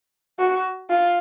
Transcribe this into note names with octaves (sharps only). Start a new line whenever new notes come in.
F#4
F4